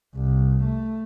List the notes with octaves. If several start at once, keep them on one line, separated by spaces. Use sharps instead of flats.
C2
A3